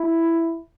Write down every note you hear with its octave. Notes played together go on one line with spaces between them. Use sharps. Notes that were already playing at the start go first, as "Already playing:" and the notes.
Already playing: E4